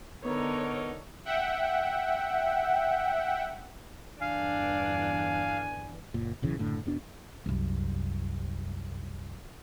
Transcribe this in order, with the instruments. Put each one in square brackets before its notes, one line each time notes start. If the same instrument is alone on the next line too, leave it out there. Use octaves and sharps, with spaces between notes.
[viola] D3 C#5 [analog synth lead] B3 [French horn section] D#4 A#4
[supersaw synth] E5 F#5 G5
[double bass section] E2 G2 D3 [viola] D4 [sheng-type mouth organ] F5 [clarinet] G#5
[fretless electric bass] F#1 A#2
D#1 B1 C#3 E3
F#1 A2 D3
E1 B2 D4
[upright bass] C2 F#2